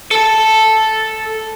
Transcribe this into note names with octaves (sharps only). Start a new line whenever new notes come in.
A4 A5